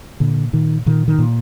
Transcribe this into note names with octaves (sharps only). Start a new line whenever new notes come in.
A#2 D3
A#2 D#3
A#2 D#3
D#3
A#2